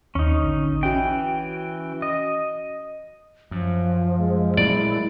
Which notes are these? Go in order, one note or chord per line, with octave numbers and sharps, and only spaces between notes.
D#2 C#4 D#4
A1 D3
E3 C#4 F#4 G5
D#5
F#2 F3
G#3
A#2 F#3 A3 E4 D5